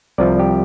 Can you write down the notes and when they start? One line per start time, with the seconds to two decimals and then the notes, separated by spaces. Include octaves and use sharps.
0.18 C2 C3 F3 D5
0.39 G4